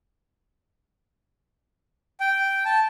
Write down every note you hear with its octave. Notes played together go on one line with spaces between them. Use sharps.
G5
A5